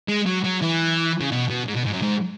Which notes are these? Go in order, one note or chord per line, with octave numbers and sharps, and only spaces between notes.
G#3
F#3
F#3
E3
C#3
B2
B2
G#2
B2
G#2
F#2
G#2